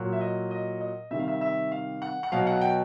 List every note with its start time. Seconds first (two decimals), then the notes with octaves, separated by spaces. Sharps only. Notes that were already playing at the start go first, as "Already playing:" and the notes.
Already playing: A#2 F#3
0.12 E5
0.21 D#5
0.51 D#5
0.81 D#5
1.11 C3 D#3 G3 E5
1.19 F5
1.28 E5
1.41 E5
1.72 F5
2.02 F#5
2.23 F#5
2.32 B2 F#3 F5
2.47 F#5
2.61 G5